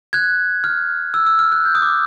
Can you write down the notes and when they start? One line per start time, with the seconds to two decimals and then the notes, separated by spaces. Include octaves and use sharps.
0.13 F#6 G#6
0.64 F6
1.14 E6
1.27 E6
1.39 F6
1.52 F#6
1.65 G6
1.75 D#6
1.82 D6